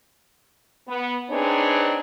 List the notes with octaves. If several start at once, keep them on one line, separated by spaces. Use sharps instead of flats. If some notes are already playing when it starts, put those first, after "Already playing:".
B3
C4 D4 D#4 G#4 B4 C#5